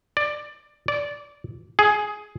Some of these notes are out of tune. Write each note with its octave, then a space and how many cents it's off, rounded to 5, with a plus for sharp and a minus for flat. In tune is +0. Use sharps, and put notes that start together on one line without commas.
D5 +15
D5 -15
G#4 +10